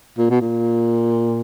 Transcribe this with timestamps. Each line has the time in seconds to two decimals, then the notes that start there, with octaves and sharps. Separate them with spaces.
0.18 A#2
0.30 B2
0.41 A#2